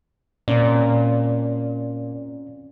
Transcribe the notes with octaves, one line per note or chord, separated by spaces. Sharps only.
A#2 C4 C#4 D5